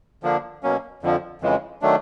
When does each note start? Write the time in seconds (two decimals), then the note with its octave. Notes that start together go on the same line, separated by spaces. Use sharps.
0.23 D3 F3 A#3 D4
0.63 B2 F#3 A#3 C#4
1.03 F2 D3 F3
1.42 F2 C#3 E3 G#3
1.82 D#3 F#3 A3 D4